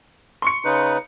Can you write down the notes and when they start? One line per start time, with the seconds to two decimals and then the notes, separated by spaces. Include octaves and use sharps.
0.42 C6 C#6 C#7
0.65 C#3 D#4 B4